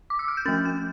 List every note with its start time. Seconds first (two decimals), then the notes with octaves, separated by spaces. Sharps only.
0.10 D6
0.19 E6
0.28 F6
0.37 G6
0.46 F3 A3 C#4 A6
0.65 G6